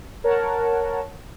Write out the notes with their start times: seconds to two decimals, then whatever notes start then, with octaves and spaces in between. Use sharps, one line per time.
0.24 A#4 C#5 F#5 A5